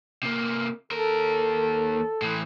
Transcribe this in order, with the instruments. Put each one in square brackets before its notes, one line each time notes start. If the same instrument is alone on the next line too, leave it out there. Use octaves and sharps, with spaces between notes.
[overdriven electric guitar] C3 A#3
[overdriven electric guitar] D#2 A#4 [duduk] A4
[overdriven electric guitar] A2 E3